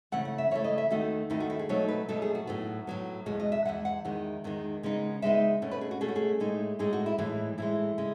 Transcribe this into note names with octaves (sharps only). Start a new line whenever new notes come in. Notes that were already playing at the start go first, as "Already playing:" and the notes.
C#3 E3 A3 F#5
F#5
E5
C#3 E3 A3 C#5
D#5
E5
D#2 D#3 A3 D#4 F#4
D#2 D#3 A3 D#4 E4
F#4
E4
G#4
B2 F#3 A3 D#4 C#5
B4
B2 F#3 A3 D#4 A4
G#4
F#4
A2 F#3 B3
A2 F#3 B3
E2 B2 G#3 F#4
D#5
E5
E2 B2 G#3 F#5
F#5
E2 D#3 G#3
E2 D#3 G#3
C#3 G#3 B3 D#4
C#3 G#3 B3 D#4 E5
B2 A3 C#4
B4
G#4
F#4
B2 A3 C#4 G#4
F#4
G#4
A2 G#3 D#4
A2 G#3 D#4 G#4
F#4
E4
A2 E3 G#3 E4
A2 E3 G#3 E4
C#3 G#3